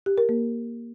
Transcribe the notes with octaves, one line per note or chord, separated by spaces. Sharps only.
G4
A#4
A#3